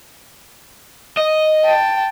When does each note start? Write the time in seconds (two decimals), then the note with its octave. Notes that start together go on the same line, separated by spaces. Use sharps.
1.17 D#5
1.65 G5 A5